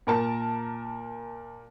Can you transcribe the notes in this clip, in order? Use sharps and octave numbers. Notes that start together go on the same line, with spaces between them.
A#2 A#4 A5